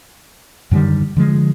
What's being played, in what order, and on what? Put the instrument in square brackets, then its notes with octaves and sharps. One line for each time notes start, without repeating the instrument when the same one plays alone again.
[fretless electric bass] F#2 D3 D#3 G3
D3 F3 G#3